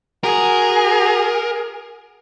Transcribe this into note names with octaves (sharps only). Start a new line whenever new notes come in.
F#4 G#4 A#4